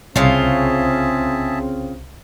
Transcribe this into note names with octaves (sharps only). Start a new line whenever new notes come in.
C2 C#3 C4 F4 G#4 E5 A5